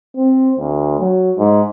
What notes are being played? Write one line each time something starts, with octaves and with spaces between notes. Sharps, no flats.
C4
D2
F#3
G#2